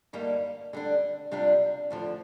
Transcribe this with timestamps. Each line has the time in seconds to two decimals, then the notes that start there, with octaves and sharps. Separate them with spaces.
0.13 G2 D3 G3 A#3 D#4
0.73 D3 G3 D4
1.31 C3 G3 D4 F4
1.90 D2 D3 F3